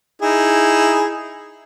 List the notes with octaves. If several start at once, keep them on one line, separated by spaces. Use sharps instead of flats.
D#4 E4 G#4